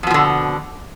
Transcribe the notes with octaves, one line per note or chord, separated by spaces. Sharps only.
F2 B2 D3 F3